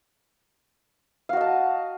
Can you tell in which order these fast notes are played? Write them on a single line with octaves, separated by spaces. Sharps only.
F5 F#4 D#5 A5